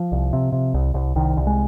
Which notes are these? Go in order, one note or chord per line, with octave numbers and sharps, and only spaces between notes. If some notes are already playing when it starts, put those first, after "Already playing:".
Already playing: F3
C2
C3
C3
C2
C2
C2 D#3
C2
G#3